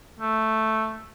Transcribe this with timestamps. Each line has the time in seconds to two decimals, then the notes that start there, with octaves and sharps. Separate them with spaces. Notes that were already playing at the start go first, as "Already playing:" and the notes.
0.20 A3